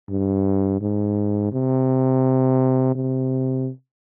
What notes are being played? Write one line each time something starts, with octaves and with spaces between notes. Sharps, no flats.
G2
G#2
C3
C3